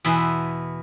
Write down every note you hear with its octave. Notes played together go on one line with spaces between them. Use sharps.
E2 B2 B3 E4 C6